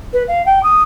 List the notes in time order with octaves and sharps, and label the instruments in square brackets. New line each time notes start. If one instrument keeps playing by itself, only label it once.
[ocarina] B4
F5
G5
D#6